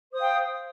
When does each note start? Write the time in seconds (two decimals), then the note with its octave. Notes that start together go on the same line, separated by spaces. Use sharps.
0.11 C5
0.14 D#6
0.17 F5
0.20 G5